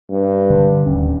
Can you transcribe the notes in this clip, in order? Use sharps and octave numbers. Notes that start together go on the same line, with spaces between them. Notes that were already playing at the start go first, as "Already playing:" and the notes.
G2
D3
D1 D#2 C#4